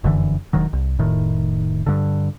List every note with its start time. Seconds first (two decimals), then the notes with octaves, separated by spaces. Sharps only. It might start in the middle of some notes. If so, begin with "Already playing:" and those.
0.04 F1 F#2 D3 E3
0.53 E1 D#3 F#3
0.73 C2
0.99 F1 A2 D#3
1.87 G2 D3